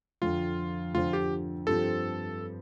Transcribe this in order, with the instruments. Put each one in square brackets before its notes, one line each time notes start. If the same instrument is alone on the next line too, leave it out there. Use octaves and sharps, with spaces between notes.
[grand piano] F2 D3 F3 [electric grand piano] F4
[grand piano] F2 D3 F3 [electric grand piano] F4
[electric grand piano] G4
[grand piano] G2 F3 C4 G4 [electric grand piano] A4